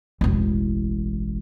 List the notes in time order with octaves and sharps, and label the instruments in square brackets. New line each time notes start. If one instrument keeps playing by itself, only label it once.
[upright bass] E1 A1